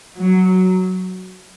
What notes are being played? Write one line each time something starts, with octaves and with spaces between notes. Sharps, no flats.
F#3